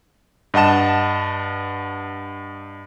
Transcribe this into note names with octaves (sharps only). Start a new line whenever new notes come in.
G2 D#5 F#5 A5 E7